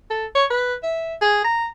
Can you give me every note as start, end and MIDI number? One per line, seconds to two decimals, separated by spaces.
0.10 0.26 69
0.35 0.45 73
0.50 0.74 71
0.83 1.14 76
1.22 1.43 68
1.44 1.66 82